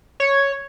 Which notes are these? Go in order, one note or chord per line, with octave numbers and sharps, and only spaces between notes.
C#5